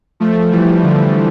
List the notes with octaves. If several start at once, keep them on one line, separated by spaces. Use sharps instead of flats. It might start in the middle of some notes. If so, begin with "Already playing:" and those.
F3 A3
E3 G3
D3 F3